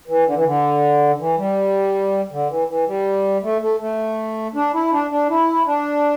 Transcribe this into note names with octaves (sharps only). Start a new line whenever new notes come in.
E3
D3
E3
D3
E3
G3
D3
E3
E3
G3
A3
A3
A3
D4
E4
D4
D4
E4
D4